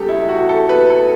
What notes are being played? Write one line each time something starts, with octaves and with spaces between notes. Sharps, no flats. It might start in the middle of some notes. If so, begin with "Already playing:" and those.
Already playing: E2 C#3 G3 G4 A4
E4
F#4
A4
B4
A4